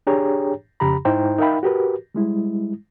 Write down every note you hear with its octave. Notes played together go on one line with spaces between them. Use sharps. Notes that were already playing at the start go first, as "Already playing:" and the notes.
D4 G4 G#4 C#5 G5 A#5
F2 C#3 G4 A#5 B5
G#2 D#4 E4 C5 G5 A#5
D#4 A#4 E5 F5 G5 B5
F#4 G4 A#4 B4
G3 G#3 E4